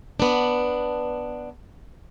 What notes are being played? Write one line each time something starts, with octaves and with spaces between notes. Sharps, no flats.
B3 D4